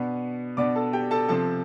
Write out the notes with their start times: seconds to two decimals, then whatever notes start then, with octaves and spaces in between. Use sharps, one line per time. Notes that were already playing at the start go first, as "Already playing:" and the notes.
Already playing: B2 B3 D4
0.57 B2 B3 D4 D5 D6
0.75 A4 A5
0.93 G4 G5
1.11 A4 A5
1.28 C3 F3 C4 A4 A5